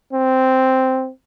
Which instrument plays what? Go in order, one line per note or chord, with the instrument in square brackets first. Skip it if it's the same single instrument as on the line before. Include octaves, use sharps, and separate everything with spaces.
[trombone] C4